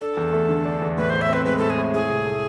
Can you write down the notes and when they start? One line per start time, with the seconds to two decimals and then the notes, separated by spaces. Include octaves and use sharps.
0.01 D4 A4
0.17 E2
0.33 A3
0.49 D3
0.65 D4
0.82 E2
0.97 A2 B4
1.10 A2 C5
1.21 E5
1.29 C4 B4
1.45 G#3 B4
1.58 A2 A4
1.70 G#4
1.78 A2
1.94 E4 G#4
2.10 C2
2.26 A3